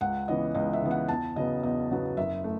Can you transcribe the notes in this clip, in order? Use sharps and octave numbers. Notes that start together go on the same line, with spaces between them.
C#2 F#5
C#3 E3 B3 D#5
C#2 D#5
E5
C#3 E3 B3
F#5
E2 A5
C#3 F#3 B3 D#5
E2 D#5
C#3 F#3 B3
F#1 E5
A3